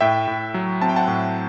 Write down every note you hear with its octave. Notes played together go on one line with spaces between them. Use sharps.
A2 E5 G5
A2
F#3
C4 A5
G5
F#5 A5
A2